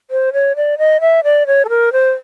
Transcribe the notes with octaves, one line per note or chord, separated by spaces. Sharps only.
C5
C#5
D5
D#5
E5
D5
C#5
A4
A#4
C5